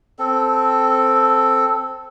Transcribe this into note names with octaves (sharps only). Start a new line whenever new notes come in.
C4 A4